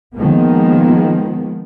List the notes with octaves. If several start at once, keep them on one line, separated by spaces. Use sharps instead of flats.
D#3 F3 G#3 A#3 B3